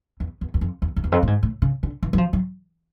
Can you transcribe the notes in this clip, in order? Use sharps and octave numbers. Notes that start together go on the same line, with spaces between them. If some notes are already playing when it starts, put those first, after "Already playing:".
E2
E2
E2
F2
E2
F2
E2
F2
A2
G#2
A2
C#3
D3
E3
F#3
F3
F#3